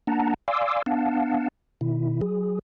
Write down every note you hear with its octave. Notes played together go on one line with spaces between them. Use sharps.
A#3 D4 F#5 A5 A#5
D5 F5 G#5 C6 D6 E6
B3 D4 F5 F#5 A5
B2 D#3 E4
F#3 G#4